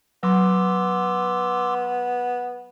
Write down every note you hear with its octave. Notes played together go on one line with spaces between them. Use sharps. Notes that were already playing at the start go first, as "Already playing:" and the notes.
F#3 B3 C6 D6 E6